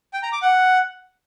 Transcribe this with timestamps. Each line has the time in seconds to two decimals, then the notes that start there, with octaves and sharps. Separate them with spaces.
0.13 G5
0.23 A#5
0.32 D6
0.42 F#5